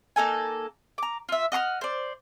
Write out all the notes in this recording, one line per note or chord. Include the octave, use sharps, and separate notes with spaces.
A#3 D#4 A4 G#5
A#5 D6
F4 E5
D#5 F#5 C6 F6
C5 D5